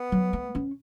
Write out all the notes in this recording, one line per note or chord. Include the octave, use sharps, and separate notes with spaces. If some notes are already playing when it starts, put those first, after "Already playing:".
Already playing: B3
F#3
A3
C#4